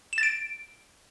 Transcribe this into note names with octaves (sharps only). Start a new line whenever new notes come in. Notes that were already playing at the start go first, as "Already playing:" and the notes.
E7
A6
D7